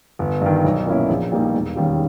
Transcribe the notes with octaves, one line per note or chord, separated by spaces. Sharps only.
G1
G2 D#3
B1
A#2 A#3 C#4 E4
A#1
A#2 G3 A#3 D#4
E1
D#2 D#3 G3 C#4